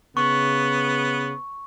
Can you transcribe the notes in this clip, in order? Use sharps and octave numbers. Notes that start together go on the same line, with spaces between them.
C#3 B3 C#6